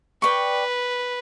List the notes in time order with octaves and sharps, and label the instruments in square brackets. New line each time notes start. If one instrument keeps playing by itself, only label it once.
[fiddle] B4 [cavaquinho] D5 G5 C#6